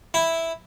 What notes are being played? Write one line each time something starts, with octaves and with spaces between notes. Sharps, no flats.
E4